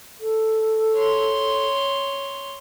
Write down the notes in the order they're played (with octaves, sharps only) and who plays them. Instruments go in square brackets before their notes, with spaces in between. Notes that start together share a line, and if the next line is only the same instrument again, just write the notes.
[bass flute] A4
[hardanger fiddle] C#5 C6